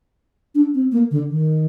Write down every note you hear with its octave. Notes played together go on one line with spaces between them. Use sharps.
D4
C4
A#3
D3
D#3